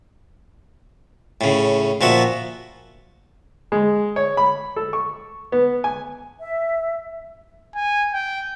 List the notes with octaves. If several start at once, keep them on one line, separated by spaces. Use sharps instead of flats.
A2 C#3
A#2 F3 F#4 E5
G#3
C#5
B5
A4
C#6
B3
G#5
E5
G#5
G5